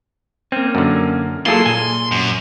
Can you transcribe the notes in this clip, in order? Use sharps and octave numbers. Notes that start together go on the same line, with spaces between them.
A#3 C4 C#4
F#2 D3
F#3 A#3 E4 F4 G#4 A4 C6
A#2 G#5
F#2